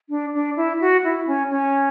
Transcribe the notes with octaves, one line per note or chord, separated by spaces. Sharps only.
D4
D4
E4
F#4
E4
C#4
C#4